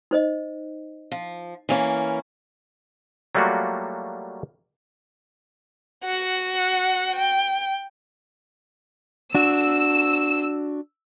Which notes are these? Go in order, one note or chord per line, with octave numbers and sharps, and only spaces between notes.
D#4 C5 D#5
F3
E3 A#3 C#4
F#3 G3 A3 A#3 F4 F#4
F#4 F#5
G5
D4 F#4 E6